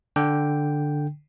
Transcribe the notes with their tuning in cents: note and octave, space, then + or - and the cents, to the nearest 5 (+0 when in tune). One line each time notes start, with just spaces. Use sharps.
D3 +5 G5 +0